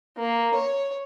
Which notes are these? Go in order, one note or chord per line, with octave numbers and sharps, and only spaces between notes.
A#3
C#5